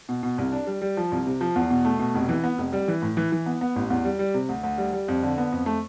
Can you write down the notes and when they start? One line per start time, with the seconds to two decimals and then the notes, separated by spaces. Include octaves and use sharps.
0.09 B2
0.23 B2
0.38 C2
0.52 D4
0.67 G3
0.82 G3
0.97 F3
1.12 C2
1.27 C3
1.41 F3
1.56 E2
1.70 B2
1.85 A3
1.99 B2
2.15 F1
2.29 E3
2.44 B3
2.58 F1
2.73 G3
2.88 E3
3.02 A2
3.17 E3
3.32 E3
3.46 B3
3.61 B3
3.76 A1
3.90 E2
4.05 G3
4.19 G3
4.34 C3
4.49 D2
4.63 D2
4.78 G3
4.93 G3
5.08 F2
5.23 D3
5.38 B3
5.52 F2
5.66 A3